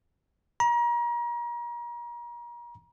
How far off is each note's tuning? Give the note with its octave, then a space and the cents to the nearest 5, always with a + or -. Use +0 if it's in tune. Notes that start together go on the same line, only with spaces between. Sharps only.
A#5 +35